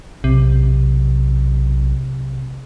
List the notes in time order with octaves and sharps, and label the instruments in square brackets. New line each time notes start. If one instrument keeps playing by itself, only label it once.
[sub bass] B1 [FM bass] C3